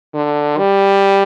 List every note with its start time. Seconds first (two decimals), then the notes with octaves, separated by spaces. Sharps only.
0.14 D3
0.58 G3